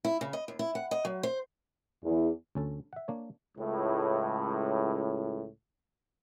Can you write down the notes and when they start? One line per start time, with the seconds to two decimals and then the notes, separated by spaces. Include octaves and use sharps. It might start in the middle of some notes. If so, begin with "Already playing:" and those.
0.05 E4
0.21 C#3
0.33 D#5
0.48 D#2
0.59 E4
0.75 F#5
0.91 D#5
1.05 F#3
1.23 C5
2.03 E2
2.55 D2 C#4 A4
2.93 E5 F#5
3.08 A#3 D4 C#5
3.58 C#2 A2